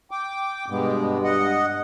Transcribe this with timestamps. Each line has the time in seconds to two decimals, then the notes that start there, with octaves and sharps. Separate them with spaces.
0.11 G5 D6
0.70 G2 B2 G#3 B3
1.24 D#5 F#5